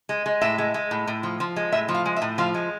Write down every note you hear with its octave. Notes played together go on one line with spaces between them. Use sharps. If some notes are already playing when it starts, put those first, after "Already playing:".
G#3
G#3
A2 E5
G#3
G#3
A2
A2
F3
F3
G#3
A2 E5
F3
F5
G#3
E5
A2
F3 F5
G#3